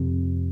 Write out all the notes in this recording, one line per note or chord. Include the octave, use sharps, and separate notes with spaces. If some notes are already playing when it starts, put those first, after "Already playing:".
Already playing: F2 C3